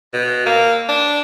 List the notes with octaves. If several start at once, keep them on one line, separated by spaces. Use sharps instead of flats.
B2
A#3
D4